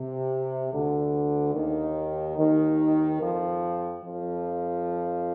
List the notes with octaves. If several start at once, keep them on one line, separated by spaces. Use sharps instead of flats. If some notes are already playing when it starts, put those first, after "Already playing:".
Already playing: C3
D2 D3
D#2 D#3
D#2 D#3
F2 F3
F2 F3